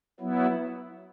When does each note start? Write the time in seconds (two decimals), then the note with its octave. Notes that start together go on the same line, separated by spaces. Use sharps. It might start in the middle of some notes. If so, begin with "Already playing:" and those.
0.20 F#3 B3 E4